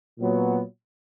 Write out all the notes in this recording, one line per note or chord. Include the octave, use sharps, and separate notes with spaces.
A#2 F#3 B3